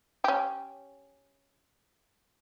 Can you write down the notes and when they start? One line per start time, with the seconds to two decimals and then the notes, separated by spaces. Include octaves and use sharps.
0.24 C#4 G4